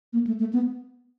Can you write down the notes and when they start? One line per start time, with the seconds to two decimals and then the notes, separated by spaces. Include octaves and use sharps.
0.13 A#3
0.27 A3
0.39 A3
0.53 B3